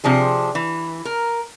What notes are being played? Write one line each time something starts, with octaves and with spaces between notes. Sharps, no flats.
C3 F3 D4 G#4
E3
A#4